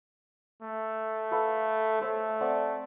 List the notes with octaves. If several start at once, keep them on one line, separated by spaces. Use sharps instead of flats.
A3
A4 B4 F5
A3 C5 C#5 C6
C4 D5 F#5